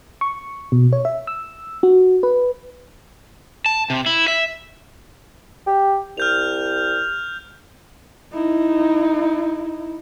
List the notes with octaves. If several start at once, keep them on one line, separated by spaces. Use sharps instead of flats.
C#6
B2
C#5
E5
E6
F#4
B4
A5
C3
E4
E5
G4
C2 F6 G6 F7
D#4 E4